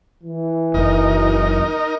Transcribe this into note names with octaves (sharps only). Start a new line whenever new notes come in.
E3
F#1 D#4 A#4